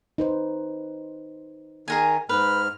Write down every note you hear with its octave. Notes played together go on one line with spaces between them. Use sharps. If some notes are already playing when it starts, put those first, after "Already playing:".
D#4 B4 C5
D#3 G#4 A#4 G#5
G#2 B4 F6